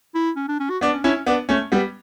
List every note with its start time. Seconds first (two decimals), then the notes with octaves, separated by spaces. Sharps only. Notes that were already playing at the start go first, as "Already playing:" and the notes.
0.15 E4
0.36 C#4
0.48 D4
0.60 C#4
0.70 F#4
0.81 B3 D4
0.93 C#4
1.04 C#4 D4 E4
1.15 C#4
1.26 B3 D4
1.49 A3 C#4
1.72 G3 B3